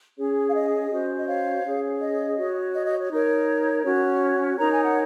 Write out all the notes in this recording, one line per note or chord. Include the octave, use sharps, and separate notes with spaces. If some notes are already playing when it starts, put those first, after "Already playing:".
C#4 G#4 C#5
F5
D#5
C#4 F#4 C5
D#5
C#5 F5
C#4 G#4 C#5
D#5
F#4 C#5
D#5
D#5
C#5
D#4 A#4 C#5
C#4 F#4 C#5
D#4 A#4 C#5 A#5
G#5
F#5